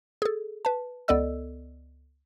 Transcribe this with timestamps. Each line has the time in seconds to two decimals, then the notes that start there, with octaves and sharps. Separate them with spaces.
0.22 G#4 A4
0.65 B4 A5
1.08 C#2 B3 A4 D5 D#5 E6